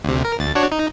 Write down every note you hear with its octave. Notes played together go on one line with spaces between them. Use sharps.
D2 C3
A#4
D2 A6
D4 F#4 C#5
D#4